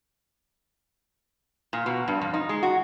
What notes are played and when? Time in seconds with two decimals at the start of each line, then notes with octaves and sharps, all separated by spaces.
1.73 A#2
1.86 B2
2.08 G2
2.21 F2
2.34 D#4
2.49 G#3
2.63 F#4